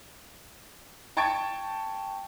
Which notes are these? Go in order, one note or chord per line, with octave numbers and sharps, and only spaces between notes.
G5 A5 C#6 G#6 A6 D7